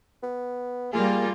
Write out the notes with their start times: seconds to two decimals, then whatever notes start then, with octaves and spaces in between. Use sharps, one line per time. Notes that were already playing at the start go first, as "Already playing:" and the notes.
0.23 B3
0.93 G3 A#3 F4 G#4